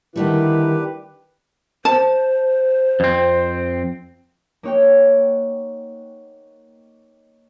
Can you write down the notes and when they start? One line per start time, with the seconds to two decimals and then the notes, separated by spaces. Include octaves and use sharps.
0.16 D3 D#3 G3 A3 E4 G4 B4
1.85 C5 A5
3.00 F2 C4
4.63 A#3 D#4 C#5 F#5 G5